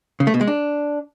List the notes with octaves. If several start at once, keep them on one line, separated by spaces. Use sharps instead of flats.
C#3
A3
B2
G#3
D4